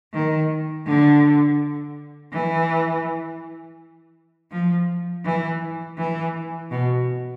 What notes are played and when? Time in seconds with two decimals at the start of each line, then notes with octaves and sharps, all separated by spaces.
0.13 D#3
0.86 D3
2.33 E3
4.52 F3
5.25 E3
5.98 E3
6.71 B2